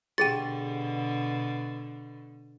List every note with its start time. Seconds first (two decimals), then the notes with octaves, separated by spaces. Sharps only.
0.18 B2 D3 G4 G#4 G5 A6 D#7